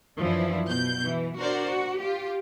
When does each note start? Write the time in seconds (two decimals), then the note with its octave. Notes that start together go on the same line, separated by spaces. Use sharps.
0.18 F#2 E3 F3 D4 E4
0.69 B2 G6
1.05 E3
1.38 D4 F#4 A#4 C5 D5
1.68 F#4
2.00 F4 G4